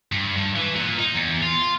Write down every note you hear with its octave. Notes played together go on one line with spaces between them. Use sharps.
G2
G2
E3
A#2
D#4
E2
F4